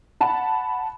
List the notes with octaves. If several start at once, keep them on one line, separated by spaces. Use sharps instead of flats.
F#5 A5 B5